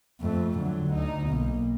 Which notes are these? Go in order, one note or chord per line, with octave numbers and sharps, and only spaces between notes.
F2 A3
D3 F#3
D2 D#4
B1 A#3